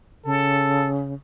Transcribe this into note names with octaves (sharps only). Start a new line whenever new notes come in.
C#3 A4